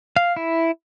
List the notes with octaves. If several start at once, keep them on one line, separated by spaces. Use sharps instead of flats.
F5
E4